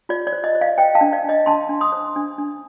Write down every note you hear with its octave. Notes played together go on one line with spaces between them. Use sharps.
F4 D5
D5
C5
D#5
C5
D5 F5
C5 D#5 G5
F5 A5
D4
D5 F5
D4 D#5
D4 A5 C6
D4
C6 D#6
C5
D4
D4